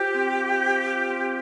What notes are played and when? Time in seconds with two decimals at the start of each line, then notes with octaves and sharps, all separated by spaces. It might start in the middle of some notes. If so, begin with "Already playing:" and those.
Already playing: F4 G4 C5
0.14 C4
0.39 F5
0.62 C5
0.86 F4
1.10 C4